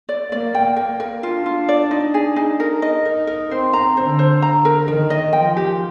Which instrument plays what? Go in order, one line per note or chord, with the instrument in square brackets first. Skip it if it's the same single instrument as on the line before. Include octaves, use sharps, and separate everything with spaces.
[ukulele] D5
[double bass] A#3 [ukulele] D5
[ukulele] G5
[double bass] A#3 [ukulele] A#4
[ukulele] A#4
[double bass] D4 [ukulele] F4
[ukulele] F4
D5
D#4
G#4
D#4
A#4
D#5
[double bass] D#4 [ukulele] A#4
[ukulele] A#4
[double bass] C4 [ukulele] C5
[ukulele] A#5
[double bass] D3 [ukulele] C5
[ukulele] C5
A#5
A#4
[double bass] D#3 [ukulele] A#4
[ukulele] D#5
[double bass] F3 [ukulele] G5
[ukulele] G4